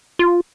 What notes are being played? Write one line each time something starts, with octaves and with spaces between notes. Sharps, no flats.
F4